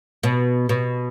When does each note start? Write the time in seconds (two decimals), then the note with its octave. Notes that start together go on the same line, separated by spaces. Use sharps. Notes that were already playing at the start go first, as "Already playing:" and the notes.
0.23 B2
0.69 B2